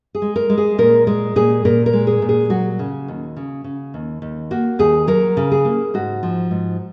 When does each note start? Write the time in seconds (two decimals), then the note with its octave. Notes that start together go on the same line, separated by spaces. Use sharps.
0.15 G#4
0.22 G#3
0.36 A#4
0.50 G#3
0.58 G#4
0.78 A#2 A#4
1.07 G#3 A#4
1.36 A#2 G#4
1.65 A#2 A#4
1.86 A#4
1.93 G#3
2.07 G#4
2.22 A#2
2.29 G#4
2.50 F#3 F#4
2.79 C#3
3.08 D#2
3.36 C#3
3.64 C#3
3.94 D#2
4.22 D#2
4.51 A#3 F#4
4.79 D#2 G#4
5.07 F#3 A#4
5.37 C#3
5.52 G#4
5.65 A#3
5.94 G#2 F#4
6.23 F3
6.51 G#2